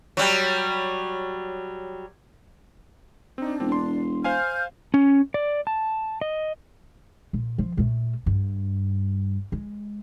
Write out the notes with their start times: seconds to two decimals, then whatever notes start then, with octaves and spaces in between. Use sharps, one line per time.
0.17 F#3 G3
3.38 C4 D4 D#4
3.60 E1 C4
3.72 C6
4.24 C5 F5 G#5 F6 G6
4.94 C#4
5.34 D5
5.67 A5
6.21 D#5
7.33 A#2
7.58 F3
7.77 A#2 A3
8.26 G2
9.52 G#3